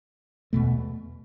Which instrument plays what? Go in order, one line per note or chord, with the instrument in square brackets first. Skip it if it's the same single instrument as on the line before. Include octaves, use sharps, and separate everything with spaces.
[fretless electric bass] E2 B2 A3